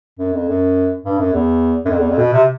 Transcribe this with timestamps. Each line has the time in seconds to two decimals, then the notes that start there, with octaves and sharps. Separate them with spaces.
0.19 F#2
0.34 F2
0.48 F#2
1.05 G2
1.19 F#2
1.33 E2
1.85 F#2
1.90 F2
1.99 E2
2.09 F2
2.18 B2
2.33 C3